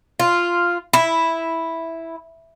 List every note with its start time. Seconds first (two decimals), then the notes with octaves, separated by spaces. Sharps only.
0.20 F4
0.93 E4